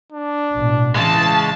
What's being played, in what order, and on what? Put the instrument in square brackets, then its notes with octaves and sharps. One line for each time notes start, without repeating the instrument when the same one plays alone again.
[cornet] D4
[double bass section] A1 B2
[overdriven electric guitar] C#3 G#3 [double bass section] E3 [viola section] A5